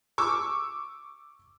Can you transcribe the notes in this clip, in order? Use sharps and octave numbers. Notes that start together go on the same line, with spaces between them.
C#6 D6 E6